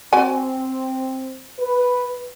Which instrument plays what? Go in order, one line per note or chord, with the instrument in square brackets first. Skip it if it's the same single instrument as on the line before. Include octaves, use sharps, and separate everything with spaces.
[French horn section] C4 [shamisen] F#4 G#5
[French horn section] B4